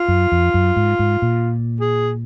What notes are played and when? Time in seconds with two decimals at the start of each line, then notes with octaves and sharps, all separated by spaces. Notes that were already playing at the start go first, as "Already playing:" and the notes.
Already playing: F4
0.08 F#2
0.32 F2
0.54 F#2
0.76 G#2
0.99 G#2
1.22 A#2
1.80 G#4